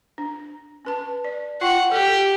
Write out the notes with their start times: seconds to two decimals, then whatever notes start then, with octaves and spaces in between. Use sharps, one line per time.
0.18 D4
0.85 C#4 B4 A5
1.24 D5
1.61 F4 F#5 G5 C#6
1.92 G4 A4